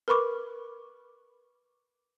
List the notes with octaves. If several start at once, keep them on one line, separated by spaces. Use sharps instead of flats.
A#4 B4 B5 C#6 D6